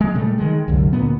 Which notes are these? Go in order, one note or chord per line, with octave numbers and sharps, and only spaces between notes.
G#3
A#2 C#3 G3 A3
D#3 G#3
C2 F#2 D3
D2 A#2 A#3 B3